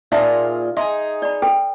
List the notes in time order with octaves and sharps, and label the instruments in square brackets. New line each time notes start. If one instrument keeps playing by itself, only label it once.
[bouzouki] A#2 F4 G#4 [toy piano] D#4 E5 B5
[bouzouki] D#4 E4 G#4 [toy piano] E5 C6
[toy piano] D5 B5
A4 B4 G5